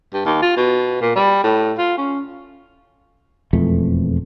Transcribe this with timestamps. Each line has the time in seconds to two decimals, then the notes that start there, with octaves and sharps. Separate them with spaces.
0.13 G2
0.25 D#2
0.42 F4
0.56 B2
1.01 A#2
1.15 G3
1.43 A2
1.78 F4
1.97 C#4
3.53 E1 F2 E3 A3